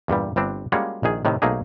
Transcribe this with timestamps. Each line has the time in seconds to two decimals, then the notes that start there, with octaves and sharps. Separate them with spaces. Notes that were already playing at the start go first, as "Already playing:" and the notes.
0.08 E2 G2 A#2 G3
0.36 G1 G3 C4 D4
0.72 G3 G#3 A#3 C#4 F4 F#4
1.03 A#1 D#3 G#4
1.25 A2 C3 D#3
1.42 B1 A3 A#3 D#4 G#4